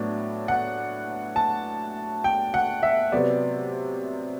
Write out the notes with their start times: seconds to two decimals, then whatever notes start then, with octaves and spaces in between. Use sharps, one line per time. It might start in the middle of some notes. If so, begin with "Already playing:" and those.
Already playing: A2 F#3 B3 D4
0.48 F#5
1.36 A5
2.24 G5
2.54 F#5
2.83 E5
3.12 C3 F#3 B3 D5